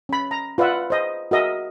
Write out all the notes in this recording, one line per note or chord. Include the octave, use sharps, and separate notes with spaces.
C#4 B5
A#5
F4 B4 D5 E5 F#5
C5 D#5
F#4 A#4 D#5 E5